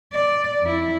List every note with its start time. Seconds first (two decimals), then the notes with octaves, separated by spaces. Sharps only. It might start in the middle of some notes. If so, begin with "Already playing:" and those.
0.13 D5
0.62 F2 E4